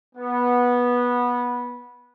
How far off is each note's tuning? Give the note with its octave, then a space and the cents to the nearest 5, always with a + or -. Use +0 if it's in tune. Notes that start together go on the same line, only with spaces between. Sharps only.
B3 -15